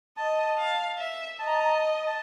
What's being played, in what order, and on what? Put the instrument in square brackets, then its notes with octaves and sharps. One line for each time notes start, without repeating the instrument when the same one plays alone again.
[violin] D#5 [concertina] A5
[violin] F5
E5
[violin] D#5 [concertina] A5
[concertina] A#5
A5
A#5
A5
A5